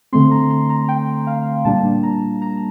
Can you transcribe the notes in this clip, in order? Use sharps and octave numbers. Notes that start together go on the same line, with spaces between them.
D3 A3 C4 C6
A#5
C6
A#5
G5
F5
A#2 G3 A#3 D4 A5
A#5
A#5